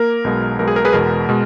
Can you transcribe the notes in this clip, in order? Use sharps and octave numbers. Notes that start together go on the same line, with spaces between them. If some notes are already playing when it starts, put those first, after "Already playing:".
Already playing: A#3 A#4
B1 B2 G#3
B1 B2 G#3 A#4
G#4
A#4
G#4 B4
E2 B2 G#3 B3 A#4
B2 G#3